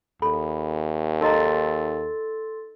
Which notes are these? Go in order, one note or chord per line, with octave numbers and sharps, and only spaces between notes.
D#2 A4 B5
D#4 A4 D#5 A#5 C6 A6